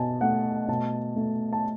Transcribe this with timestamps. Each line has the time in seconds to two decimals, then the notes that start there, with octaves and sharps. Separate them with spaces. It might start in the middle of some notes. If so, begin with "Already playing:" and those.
Already playing: B2 G#5 A5
0.21 A3 F#5
0.68 B2 A5
1.16 A3
1.53 A5